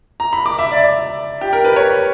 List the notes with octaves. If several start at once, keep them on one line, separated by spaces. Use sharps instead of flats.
A#5
B5
D6
E5
D5
G4
A#4
B4
C#5